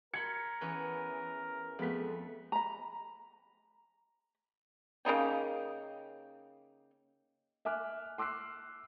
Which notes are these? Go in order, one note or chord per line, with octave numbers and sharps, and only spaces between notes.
A#4 A5 B5 C6 G#6 C#7
E2 C#4 B4
F2 G#3 A3 B3 B6
A#5 B5
C#3 A#3 D#4 G4
E5 G#5 D6 F6 F#6
C6 D6 E6 F#6 C7